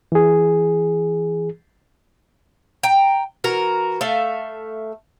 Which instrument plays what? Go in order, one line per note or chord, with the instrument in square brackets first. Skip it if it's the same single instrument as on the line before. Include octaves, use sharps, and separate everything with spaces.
[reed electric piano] E3 G#4
[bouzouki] G5 A#5
E3 F#4 A#4
A3 A4 E5 F5